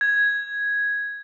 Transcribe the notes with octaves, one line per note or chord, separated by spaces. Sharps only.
G#6